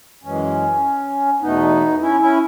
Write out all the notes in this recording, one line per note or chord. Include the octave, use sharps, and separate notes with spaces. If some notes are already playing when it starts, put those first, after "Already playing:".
F#2 E3 G#3 C#4
E2 B2 A3 B3 D#4
C#4 E4
C#4 E4